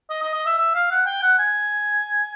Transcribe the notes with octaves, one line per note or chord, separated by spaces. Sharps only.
D#5
D#5
D#5
E5
E5
F5
F#5
G5
F#5
G#5